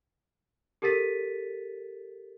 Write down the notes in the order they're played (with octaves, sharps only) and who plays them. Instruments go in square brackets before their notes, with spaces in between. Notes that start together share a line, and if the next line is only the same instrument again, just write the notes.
[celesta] G4 A4 A#4 A6 B6 D#7